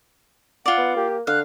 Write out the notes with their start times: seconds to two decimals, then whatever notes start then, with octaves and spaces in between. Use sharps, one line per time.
0.66 F4 D5 F#5
0.78 B3
0.96 A#3 G4
1.27 D3 F5 F#6